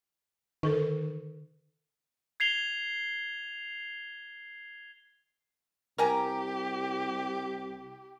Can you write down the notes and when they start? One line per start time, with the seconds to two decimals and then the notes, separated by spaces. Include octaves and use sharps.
0.63 D3 D#3 A4 A#4
2.40 G#6 C7 F7 G7
5.98 C2 G4 A#4 G#5 A#5